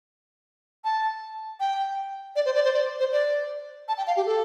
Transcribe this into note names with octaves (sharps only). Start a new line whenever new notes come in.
A5
G5
D5
C5
D5
C5
D5
C5
D5
A5
G5
F5
G4
A4